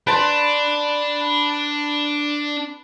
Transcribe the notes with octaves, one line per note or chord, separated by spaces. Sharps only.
D4 B4 A5 C6